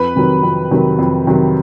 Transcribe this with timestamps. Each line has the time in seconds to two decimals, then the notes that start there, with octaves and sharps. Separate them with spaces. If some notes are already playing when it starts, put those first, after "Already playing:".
Already playing: F2 B4 B5
0.16 C3 D#3 F#3
0.43 F2
0.71 C3 D#3 F#3
0.99 F2
1.27 C3 D#3 F#3